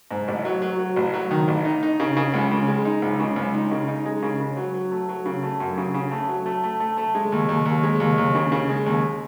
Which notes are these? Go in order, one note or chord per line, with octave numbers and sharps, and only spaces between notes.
G#2
A1
F#3
F#3
F#3
A1
F#3
D#3
A1
D#4
D#4
C#3
C#3
C#2
C#3
G#3
D#4
C#2
C#3
C#2
D#4
C#3
D#4
G#3
C#3
C#3
F#3
F#3
A3
F#3
C#3
A3
F#2
C#3
C#3
A3
F#3
A3
A3
A3
A3
G#3
D#2
D#2
D#2
G#3
D#2
D#2
C#3
C#3
G#3
D#2